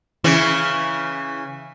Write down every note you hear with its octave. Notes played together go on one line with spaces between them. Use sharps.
C#3 E3 E4